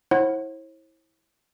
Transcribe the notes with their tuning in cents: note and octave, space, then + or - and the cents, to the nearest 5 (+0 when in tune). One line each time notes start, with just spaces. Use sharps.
E4 -20 C5 +45 F#5 +0